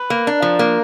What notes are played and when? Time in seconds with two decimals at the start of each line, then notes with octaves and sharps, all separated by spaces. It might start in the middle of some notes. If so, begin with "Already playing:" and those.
Already playing: B4
0.10 A#3
0.26 D4 A#4
0.42 F3
0.59 A#3